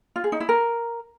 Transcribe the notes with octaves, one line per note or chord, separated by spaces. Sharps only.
F4
G#4
D#4
E4
A#4